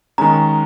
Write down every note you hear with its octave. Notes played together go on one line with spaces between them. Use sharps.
D#3 G#3 C#4 A#5